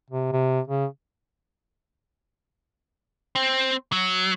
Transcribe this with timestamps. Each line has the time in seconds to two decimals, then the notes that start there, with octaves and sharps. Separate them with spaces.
0.11 C3
0.32 C3
0.68 C#3
3.35 C4
3.92 F#3